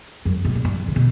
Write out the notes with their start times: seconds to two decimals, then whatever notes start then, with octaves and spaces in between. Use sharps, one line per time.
0.25 F#2
0.45 B2
0.55 A#2
0.65 G2
0.80 D3
0.88 C#3
0.96 B2